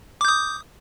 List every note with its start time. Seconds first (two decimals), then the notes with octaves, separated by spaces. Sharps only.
0.21 D6
0.25 G6
0.28 D#6